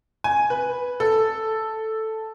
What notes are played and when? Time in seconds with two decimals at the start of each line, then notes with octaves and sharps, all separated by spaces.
0.24 G#5
0.50 B4
1.00 A4